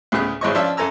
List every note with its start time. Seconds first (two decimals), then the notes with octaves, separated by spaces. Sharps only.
0.12 D2 A2 C#3 B3 G#4 F#6
0.41 G#1 G#2 E4 C#5 D#5 C#6
0.55 F3 C#4 D4 E5 F5 E6
0.77 F#2 A4 G#5 A#5 E6